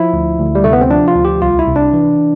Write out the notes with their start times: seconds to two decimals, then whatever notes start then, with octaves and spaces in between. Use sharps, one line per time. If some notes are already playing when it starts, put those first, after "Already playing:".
Already playing: F3 E4
0.13 D2
0.39 D2
0.55 G3
0.64 C3 A3
0.73 B3
0.81 C4
0.90 F3 D4
1.08 F4
1.16 D2
1.25 G4
1.42 C2 F4
1.59 E4
1.68 C3
1.76 D4
1.93 E3